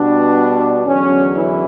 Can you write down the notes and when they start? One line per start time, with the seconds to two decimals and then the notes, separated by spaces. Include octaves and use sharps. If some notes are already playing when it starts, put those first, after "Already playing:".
Already playing: B2 G3 B3 D4
0.85 E2 D3 F#3 C#4
1.36 E3 E4